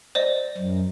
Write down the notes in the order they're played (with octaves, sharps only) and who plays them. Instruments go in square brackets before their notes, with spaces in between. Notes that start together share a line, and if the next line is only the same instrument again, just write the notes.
[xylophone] C5 D5 D#5
[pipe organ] F#2